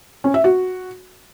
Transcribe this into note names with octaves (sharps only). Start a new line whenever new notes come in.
C#4
E5
F#4